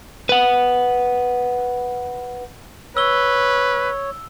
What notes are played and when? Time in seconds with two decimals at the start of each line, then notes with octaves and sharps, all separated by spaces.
0.29 B4 F#5
2.97 B4 C#5 E6 G7